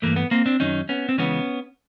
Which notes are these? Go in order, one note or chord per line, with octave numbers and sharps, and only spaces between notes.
G2 E3 A3 A#3
B3
A#3 C4
C4 D4
F#2 D#3 F#3 C#4 D#4
B3 C#4
C4
C#2 C#3 E3 G#3 B3 C#4